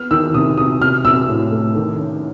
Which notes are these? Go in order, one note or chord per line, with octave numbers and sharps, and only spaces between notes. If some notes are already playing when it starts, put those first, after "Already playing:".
Already playing: B3 F6
D#3 E6
C3 D#6
C3 D#6
C3 F6
C3 E6
A2
A3
D#3
C#4